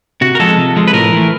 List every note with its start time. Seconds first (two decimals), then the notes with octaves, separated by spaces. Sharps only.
0.21 C3 F#4
0.35 A#4
0.40 F3 G#3 A4
0.58 C3
0.76 F3 G#3
0.87 B4
0.93 A2 A#4
1.12 E3 A3